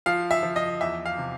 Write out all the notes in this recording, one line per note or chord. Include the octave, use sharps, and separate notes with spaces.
F3 F5
E5
F3
D#5
E2 E5
F5
C3